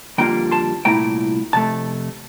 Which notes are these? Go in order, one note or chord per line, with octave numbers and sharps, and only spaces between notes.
F2 D3 G3 A#3 F4 G5 A#5
A5 C6
C2 A#2 A3 E4 G5 A#5
F2 C3 A3 A5